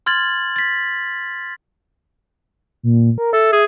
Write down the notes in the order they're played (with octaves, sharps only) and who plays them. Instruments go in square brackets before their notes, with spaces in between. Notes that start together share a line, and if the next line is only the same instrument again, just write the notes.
[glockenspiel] C6 F6 G#6 A6 F#7
A6 B6
[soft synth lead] A#2
A#4
[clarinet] A4 [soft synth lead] E5
[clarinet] G#4